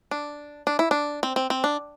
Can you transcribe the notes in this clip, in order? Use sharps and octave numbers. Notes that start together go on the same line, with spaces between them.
D4
D4
E4
D4
C4
C4
C4
D4